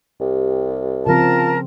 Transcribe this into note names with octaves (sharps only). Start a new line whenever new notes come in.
C2 G4
C#3 F3 C4 F4 A#4 A5